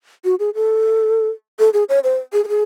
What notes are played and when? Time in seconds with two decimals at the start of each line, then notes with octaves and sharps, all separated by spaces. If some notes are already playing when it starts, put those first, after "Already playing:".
0.25 F#4
0.39 G#4
0.55 A4
1.59 A4
1.73 G#4
1.89 C#5
2.04 C5
2.33 G#4
2.44 A4
2.48 G#4